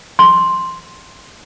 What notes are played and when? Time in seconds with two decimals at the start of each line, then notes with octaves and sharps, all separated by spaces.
0.19 C6